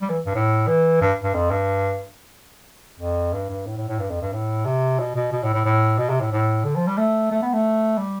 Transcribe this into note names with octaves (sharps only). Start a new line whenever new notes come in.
G3
E3
G2
A2
E3
G2
G2
F2
G2
F2
G2
G2
A2
A2
A2
G2
F2
G2
A2
C3
B2
B2
B2
A2
A2
A2
B2
C3
A2
A2
D3
F3
G3
A3
A3
B3
A3
G3